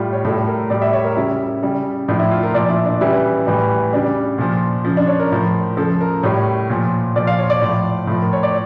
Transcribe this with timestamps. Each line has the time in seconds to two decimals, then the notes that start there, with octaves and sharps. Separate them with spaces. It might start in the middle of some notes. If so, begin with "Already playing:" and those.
Already playing: A2 G3 F4
0.13 C#5
0.25 A2 G3 A4
0.47 A#4
0.70 A2 G3 D5
0.82 E5
0.93 C#5
1.04 A#4
1.17 C#3 G3 E4
1.62 C#3 G3
2.08 A2 F3 D4
2.19 E4
2.31 F4
2.43 A#4
2.54 A#2 F3 D5
2.70 E4
2.85 D4
3.01 C#3 E3 G3 E4
3.46 A2 E3 G3
3.93 C#3 G3 D4
4.38 A#2 F3
4.85 C#3 F3
4.97 D4
5.07 C#5
5.20 A#4
5.32 A2 F3
5.77 C#3 F3 A4
6.01 A#4
6.23 A2 G3 C#5
6.70 A#2 F3
7.15 A#2 F3 D5
7.27 F5
7.39 C#5
7.50 D5
7.62 A2 F3
8.07 A2 F3
8.22 A#4
8.33 C#5
8.43 D5